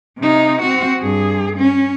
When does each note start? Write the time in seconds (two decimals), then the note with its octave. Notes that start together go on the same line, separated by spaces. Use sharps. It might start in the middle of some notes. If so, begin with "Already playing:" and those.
0.19 C3 D#4
0.62 C4 F#4
1.01 G2 G#4
1.57 C#4